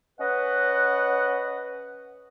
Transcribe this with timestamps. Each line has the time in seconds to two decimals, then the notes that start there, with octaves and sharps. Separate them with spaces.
0.20 C#4 B4 D#5 F#5